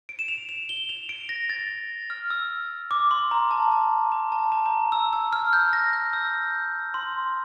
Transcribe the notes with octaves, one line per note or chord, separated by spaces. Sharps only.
D7
E7
F7
F7
G7
F7
D7
A#6
A6
F6
E6
D6
C6
A#5
A5
A#5
A#5
A5
A#5
A#5
E6
E6
F6
G6
A#6
G6
E6
C6